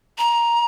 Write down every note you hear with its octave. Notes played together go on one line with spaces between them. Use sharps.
A#5